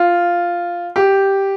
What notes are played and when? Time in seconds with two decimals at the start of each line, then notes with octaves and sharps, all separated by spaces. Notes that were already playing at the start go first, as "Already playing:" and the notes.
Already playing: F4
0.96 G4